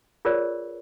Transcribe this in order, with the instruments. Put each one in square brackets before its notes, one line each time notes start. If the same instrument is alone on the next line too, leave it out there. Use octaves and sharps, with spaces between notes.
[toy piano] F4 G#4 A#4 B4 C#5 D5